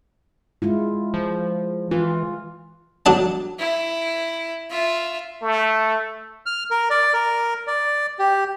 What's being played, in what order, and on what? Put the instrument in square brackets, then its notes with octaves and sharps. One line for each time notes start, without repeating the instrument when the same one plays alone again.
[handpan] G#3 E4 F4
[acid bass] F3
[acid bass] E3 [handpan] F4
[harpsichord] F#3 D4 A5
[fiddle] E4
F4 E5
[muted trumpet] A3
[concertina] F6
A#4
D5
A#4
D5
G4